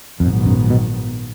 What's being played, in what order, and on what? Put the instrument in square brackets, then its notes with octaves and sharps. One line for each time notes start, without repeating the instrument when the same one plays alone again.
[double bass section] A#1 G#2 D#3 F#3 B3 [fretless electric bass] F2
[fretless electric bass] F#2
B2